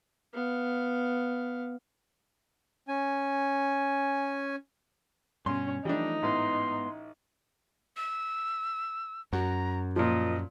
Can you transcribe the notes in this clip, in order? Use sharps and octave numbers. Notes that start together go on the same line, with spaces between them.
B3 F5
C#4 G#5
G2 B2 C#4 C6
E3 F3 G3 A3 D4 D#4
A1 G#2 B3 C6
E6
F#2 F#4 A#5
A#2 F3 D#5